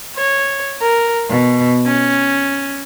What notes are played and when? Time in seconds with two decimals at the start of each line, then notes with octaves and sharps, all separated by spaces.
0.16 C#5
0.80 A#4
1.29 B2
1.86 C#4